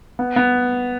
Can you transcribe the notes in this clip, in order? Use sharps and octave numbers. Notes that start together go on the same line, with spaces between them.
B3
B3